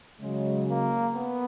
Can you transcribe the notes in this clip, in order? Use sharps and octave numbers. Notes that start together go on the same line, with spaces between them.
C#3 F#3 G#3
A#3
B3